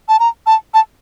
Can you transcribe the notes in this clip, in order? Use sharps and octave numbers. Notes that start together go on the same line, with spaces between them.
A5
A#5
A5
A5